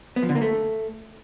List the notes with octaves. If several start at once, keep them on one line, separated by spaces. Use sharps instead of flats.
B3
F3
D3
A#3
A3